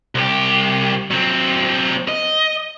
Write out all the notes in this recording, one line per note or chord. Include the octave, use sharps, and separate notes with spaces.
C2 G4
F#3 C4
D#5